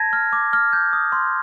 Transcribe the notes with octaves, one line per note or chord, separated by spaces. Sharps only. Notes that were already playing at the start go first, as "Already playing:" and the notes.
Already playing: A5 G#6 A#6
F6
D6
F6
G6
D#6
C6